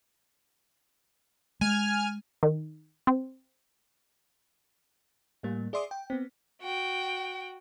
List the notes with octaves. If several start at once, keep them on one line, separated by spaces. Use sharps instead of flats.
G#3 G#5 F6
D#3
C4
A2 G3 A#3
G#4 D5 E5 C6 D6 D#6
G5
B3 C4
F#4 G5